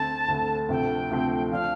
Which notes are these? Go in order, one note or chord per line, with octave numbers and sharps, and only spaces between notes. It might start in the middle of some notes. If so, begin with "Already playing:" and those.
Already playing: D2 D3 A3 C4 A5
D2 D3 A3 C4
D2 C3 F3 A3 C4 G5
D2 C3 F3 A3 C4
F3 D4 F4 F5